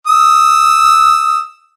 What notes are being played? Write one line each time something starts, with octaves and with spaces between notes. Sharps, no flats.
D#6 E6